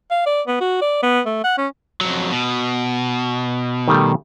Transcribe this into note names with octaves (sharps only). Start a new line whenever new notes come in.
F5
D5
B3
F#4
D5
B3
A3
F#5
C#4
F2 F#3
B2
D#3 G3 A3